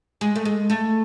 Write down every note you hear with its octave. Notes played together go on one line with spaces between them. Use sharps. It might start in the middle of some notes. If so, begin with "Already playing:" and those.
G#3
A3
G#3
A3